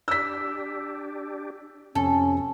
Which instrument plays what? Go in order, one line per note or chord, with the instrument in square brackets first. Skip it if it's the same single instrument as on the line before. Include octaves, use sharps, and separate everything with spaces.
[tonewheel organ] D4 G4 [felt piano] E6 B6
[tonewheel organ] F2 C3 [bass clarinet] C#4 [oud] A4